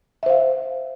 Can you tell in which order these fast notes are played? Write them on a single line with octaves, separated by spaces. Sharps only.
E5 C5 F5